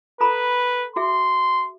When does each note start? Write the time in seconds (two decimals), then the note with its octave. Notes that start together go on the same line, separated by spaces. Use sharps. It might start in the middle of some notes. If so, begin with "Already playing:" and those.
0.21 A4 B4 A#5 B5
0.96 F#4 G#4 E5 C6